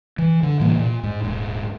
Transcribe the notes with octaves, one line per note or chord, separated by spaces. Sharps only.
E3
D3
A2 C3 E3 A#3
A#2
G#2
D#1 G#2